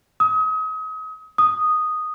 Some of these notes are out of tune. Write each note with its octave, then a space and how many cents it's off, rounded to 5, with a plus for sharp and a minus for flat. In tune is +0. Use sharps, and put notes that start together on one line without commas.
D#6 +35
D#6 -5